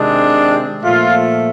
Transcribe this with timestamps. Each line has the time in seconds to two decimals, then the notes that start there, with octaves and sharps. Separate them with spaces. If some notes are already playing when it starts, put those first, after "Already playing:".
Already playing: C3 D#3 G#3 C4 D4
0.81 A#2 F3 A3 F4